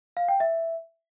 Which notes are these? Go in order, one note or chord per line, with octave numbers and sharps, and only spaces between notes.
F5
G5
E5